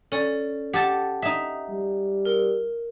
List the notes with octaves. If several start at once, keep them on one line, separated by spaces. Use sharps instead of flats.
C#4 A4 D5
G4 A4 F#5 A5
D#4 E5
G3
A#4